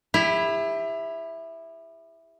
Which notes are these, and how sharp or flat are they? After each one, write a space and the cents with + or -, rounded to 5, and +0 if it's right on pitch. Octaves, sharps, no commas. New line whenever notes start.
E4 +0 G4 +40